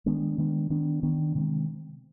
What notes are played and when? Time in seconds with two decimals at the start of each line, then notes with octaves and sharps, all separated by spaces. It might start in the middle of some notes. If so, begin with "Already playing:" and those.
0.06 D#3 G#3 B3 D4
0.38 D#3 G#3 B3 D4
0.70 D#3 B3 D4
1.03 D#3 B3 D4
1.35 C3 D#3 G#3 C4